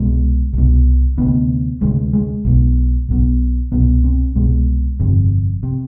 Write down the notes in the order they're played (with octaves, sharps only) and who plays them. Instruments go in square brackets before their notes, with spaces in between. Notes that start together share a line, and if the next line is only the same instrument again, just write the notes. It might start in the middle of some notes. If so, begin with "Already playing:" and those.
Already playing: [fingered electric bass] C2 B2 G#3
C2 B2
D2 C3 B3
D2 C3 G#3
G#3
B1 B2
B1 B2
C2 B2 B3
C4
C2 B2 G#3
G1 F2 C3
C3